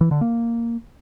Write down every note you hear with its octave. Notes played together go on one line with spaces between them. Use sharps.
E3
D3
A#3